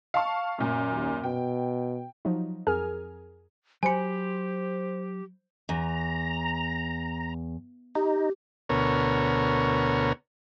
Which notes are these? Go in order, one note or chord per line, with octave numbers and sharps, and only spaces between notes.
F5 A5 C#6
F#2 A#2
D#2
B2 G5
F3 F#3 D#4
F2 G#4 A#4 G#5 F6
F#3 G4 C5 G#5 B5 C#7
E2 A#5
D#4 G4
D2 B2 A#4 C#5